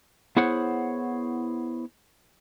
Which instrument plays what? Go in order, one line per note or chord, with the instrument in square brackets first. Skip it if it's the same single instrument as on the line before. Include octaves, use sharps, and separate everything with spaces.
[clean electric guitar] B3 E4 G#4 C5 C#5 F#5